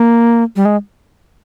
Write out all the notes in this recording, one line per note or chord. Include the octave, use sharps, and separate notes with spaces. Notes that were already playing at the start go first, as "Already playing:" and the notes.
Already playing: A#3
G3
G#3